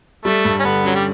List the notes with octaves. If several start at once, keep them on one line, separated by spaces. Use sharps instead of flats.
G3 A3
G2
C#4
D3 B3
F#3 C#4
G3